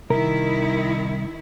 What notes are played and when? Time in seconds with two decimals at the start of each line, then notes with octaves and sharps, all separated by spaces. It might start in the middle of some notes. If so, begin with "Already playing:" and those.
0.10 C2 D#3 E4 A#4